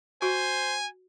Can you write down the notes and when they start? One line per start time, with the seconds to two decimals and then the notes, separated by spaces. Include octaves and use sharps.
0.22 F#4 C5 G#5